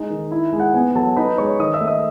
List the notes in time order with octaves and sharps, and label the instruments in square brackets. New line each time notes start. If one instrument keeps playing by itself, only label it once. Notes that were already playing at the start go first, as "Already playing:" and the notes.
Already playing: [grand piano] G#3 D#4
D#3
E4
G#3
F#5
B3 G#5
F#3 A4 A5
D#4 B4 B5
G#3 C#5 C#6
D#3 D#5 D#6
E5 E6
A3
D#5 D#6